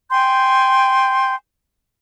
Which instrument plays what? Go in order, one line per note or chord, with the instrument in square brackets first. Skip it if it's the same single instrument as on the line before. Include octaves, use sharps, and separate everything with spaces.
[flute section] G5 G#5 C6 G6